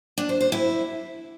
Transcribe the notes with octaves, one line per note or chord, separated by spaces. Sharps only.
D4
C5
C5
E4